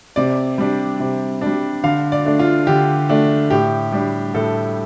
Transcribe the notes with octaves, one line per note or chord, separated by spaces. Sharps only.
C3 D5
G3 D4
C3
G3 D4
D3 F5
D5
A3 D4
F4
D3 G4
A3 D4
A2 G4
G3 D4
A2 A4